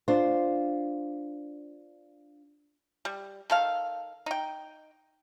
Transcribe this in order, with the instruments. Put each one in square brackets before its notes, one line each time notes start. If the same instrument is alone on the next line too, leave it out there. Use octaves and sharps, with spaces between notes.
[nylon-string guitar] D4 F4 C5
[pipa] G3
D#3 A4 F5
D#4 G5